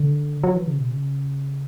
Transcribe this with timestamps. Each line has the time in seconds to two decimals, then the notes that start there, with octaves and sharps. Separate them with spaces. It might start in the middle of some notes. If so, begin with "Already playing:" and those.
Already playing: D3
0.43 F#3
0.55 E3
0.67 C#3
0.78 B2
0.90 C#3